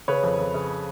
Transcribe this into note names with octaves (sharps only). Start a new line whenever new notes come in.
C#3 B4 C#5
F2
F2
C#3